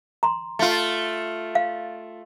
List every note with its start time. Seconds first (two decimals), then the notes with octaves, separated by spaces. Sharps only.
0.23 A#5 C6
0.59 A3 F4
1.55 F5